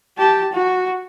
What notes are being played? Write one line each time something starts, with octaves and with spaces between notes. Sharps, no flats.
G4 A5
F#4